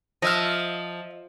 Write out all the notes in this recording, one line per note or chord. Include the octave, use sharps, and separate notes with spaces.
F3 D#5 E5 F6